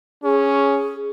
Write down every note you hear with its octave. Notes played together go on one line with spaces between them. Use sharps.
C#4 G#4